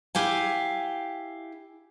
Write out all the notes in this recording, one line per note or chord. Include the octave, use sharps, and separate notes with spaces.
E4 G4 F5 G#5